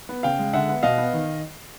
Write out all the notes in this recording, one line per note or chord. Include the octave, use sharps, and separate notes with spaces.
B3
C#3 F5 G5
G#3
D3 E5 F#5
B3
B2 D#5 F5
B3
D#3